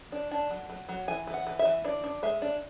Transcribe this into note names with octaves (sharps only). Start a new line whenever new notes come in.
D4
D4 A5
F#3
F#3
F#3
E3 G#5
E3
F#5
E3
E5
E3
D4 D5
D4
G#3 E5
D4